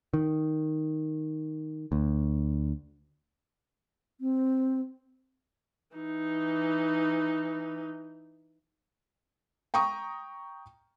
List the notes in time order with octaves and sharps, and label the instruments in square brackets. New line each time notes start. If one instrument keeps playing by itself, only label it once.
[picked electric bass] D#3
D2
[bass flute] C4
[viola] E3 D#4
[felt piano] G5 A#5 C#6 D#6